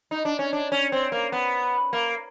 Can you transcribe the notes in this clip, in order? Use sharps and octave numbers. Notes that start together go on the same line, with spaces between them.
D#4
D4
C#4
D4
C#4
C4
A#3
B3
A#3